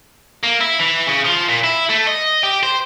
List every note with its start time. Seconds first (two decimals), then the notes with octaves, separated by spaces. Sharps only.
0.43 A#3
0.61 E4
0.80 E3
1.07 C#3
1.25 F3
1.49 A#2
1.64 E4
1.90 A3
2.07 D#5
2.43 G4
2.63 C5